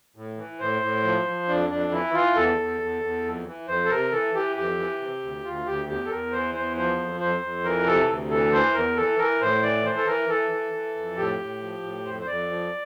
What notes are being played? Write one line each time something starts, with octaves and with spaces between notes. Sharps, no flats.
A2
E3
A2 C5
A2
F3
F3
F2 D4
F2 D4
E3 E4
E3 F4
E2 A4
E2
E2
E2
F2
E3
F2 C5
A4
C3 A#4
E3 A4
E3 G4
F2 G4
E3
C3
D2
D2 F4
D2 G4
E2 G4
A4
E2 A#4
E3 C5
E2 C5
F3 C5
F2
F2 C5
F2
E3 A#4
C3 A4
D2
E3 A4
E3 C5
E2 A#4
E3 A4
E3 A#4
A2 C5
E3 D5
E3 C5
A4
E3 A#4
E3 A4
E3
E3
F2
A2 G4
A2
F3
A2
F2 C5
C5
F2 D5
F3